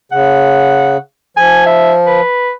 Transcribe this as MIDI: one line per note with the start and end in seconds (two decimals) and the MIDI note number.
0.12 0.97 49
0.12 0.97 78
1.37 2.21 53
1.37 1.62 80
1.66 1.94 76
2.06 2.51 71